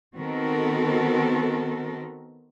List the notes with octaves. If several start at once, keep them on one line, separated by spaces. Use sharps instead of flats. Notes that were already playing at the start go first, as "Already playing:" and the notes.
D#3 B3 C4 F#4 A4 A#4